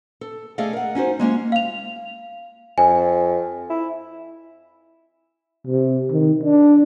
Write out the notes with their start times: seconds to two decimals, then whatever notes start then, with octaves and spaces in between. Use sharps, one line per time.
0.21 A4
0.58 A3 G#4 A4 D5 D#5 F5
0.73 A#4 F#5
0.95 C#4 D#4 F#4 C5
1.19 G#3 A#3 C#4 F4
1.52 F5 F7
2.78 F2 G#5
3.70 E4
5.67 C3
6.11 D#3
6.43 D4